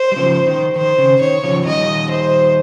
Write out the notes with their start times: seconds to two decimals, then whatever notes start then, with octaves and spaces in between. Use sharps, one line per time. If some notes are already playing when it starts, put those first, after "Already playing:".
Already playing: C5
0.12 G3
0.16 C#3 F3
0.47 D#3
0.76 D#3 C5
0.98 C#3
1.21 D#3 C#5
1.44 C#3 F3
1.66 D#3 G3 D#5
2.11 C5